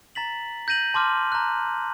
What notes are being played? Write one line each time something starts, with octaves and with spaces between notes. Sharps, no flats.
A#5 A6 B6 F#7
G6 A#6 D#7 F#7
A5 C6 D6 F6
A#5 F#6